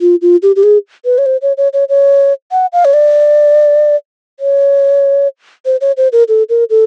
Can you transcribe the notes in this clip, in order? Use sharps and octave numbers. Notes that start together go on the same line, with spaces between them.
F4
F4
G4
G4
G#4
B4
C#5
C5
C#5
C#5
C#5
C#5
F#5
F5
C#5
D5
C#5
C5
C#5
C5
A#4
A4
A#4
A4